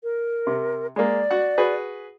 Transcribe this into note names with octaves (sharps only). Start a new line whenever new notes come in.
A#4
C3
G#3 A#3 D5
F#4 F#5
F#4 G#4 B4